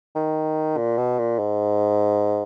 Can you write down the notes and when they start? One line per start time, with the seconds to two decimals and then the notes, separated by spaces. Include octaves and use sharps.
0.16 D#3
0.77 A#2
0.98 B2
1.19 A#2
1.39 G#2